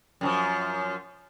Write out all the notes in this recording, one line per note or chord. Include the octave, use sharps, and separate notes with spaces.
F#2 D#3 F3